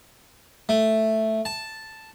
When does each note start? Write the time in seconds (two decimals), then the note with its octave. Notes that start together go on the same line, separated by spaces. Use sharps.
0.69 A3
1.45 A5